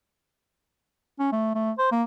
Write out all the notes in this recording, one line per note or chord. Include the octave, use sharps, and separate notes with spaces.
C#4
A3
A3
C5
A#3